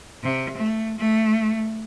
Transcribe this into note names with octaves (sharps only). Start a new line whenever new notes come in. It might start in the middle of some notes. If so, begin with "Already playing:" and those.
C3
A3
A3